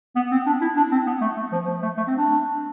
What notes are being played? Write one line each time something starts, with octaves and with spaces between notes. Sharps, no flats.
B3
C4
D4
E4
D4
C4
B3
A3
A3
F3
F3
A3
A3
C4
D4